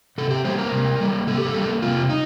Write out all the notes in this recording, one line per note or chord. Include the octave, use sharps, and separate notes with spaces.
C3 A4
G4
G3 A#3 C5
A#4
C3
G3 A#3
C3 A4
G4
A4
G3 A#3
C3 F4
D#4